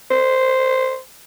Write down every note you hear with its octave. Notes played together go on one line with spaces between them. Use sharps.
C5